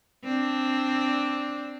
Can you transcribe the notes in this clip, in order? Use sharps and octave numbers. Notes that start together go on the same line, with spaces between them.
C4 D4